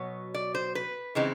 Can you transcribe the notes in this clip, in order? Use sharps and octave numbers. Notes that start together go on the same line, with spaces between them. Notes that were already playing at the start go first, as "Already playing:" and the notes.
Already playing: B2 F#3 B3 C#5
D5
C5
B4
C#3 E3 G#3 C4 D#4